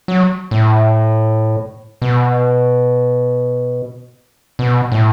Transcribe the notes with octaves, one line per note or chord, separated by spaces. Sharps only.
F#3
A2
B2
B2
A2